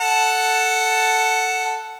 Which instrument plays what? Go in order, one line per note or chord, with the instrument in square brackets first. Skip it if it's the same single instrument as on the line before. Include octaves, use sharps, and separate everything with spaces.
[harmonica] A4 F#5 A5